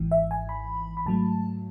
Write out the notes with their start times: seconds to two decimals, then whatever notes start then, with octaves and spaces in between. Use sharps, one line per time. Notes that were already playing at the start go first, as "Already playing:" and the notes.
Already playing: G#1 G#2 E3
0.11 E5
0.31 G#5
0.49 B5
0.97 B5
1.06 G#2 F#3 A3 A5